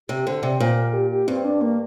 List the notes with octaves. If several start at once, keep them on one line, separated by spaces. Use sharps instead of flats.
C3 G4
D3 C5
C3 D5
A#2 C5
A#4
G4
G4
G2 C4
D4
A#3